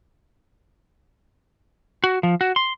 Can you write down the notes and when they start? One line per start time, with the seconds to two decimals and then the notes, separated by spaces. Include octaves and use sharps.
2.04 F#4
2.23 F3
2.41 F#4
2.56 C6